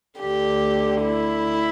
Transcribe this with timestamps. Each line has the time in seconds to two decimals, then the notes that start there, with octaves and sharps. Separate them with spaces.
0.20 D2 D3 G4
1.03 E4